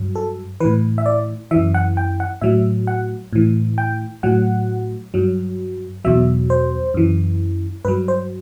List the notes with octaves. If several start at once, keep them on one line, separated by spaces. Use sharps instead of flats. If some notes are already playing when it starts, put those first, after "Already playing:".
Already playing: G2 F#3
A4
A2 E3 B4
E5
D5
F#2 E3 E5
F#5
G5
F#5
A2 F#3 E5
F#5
A2 E3
G5
A2 F#3 F#5
G2 F#3
E2 B2 F#3 E5
C5
F#2 E3
G2 F#3 B4
C5